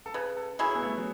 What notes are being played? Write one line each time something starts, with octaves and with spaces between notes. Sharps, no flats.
A4
C#3 B4
A4
F#3 C#4 E4 G#4
B3
A3
F#3